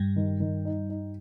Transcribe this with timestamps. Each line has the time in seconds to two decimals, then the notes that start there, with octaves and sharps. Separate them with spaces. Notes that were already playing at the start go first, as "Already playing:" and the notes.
Already playing: G2 G3
0.16 D#3
0.40 D#3
0.65 D#4
0.89 D#4